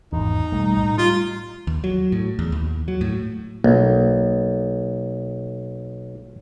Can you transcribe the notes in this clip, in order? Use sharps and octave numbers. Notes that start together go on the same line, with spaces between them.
G#1 E2 D#4
B1 G3 A3
A2
G3 F4
D#2
F#3
A2
E2
D#2
F#3
A2
B1 A#3